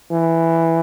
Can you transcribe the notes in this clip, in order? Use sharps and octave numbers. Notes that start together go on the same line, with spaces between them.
E3